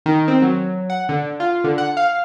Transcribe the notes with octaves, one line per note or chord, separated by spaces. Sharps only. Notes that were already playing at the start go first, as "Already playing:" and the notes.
D#3
C4
F#3
F#5
D3
F4
D3
F#5
F5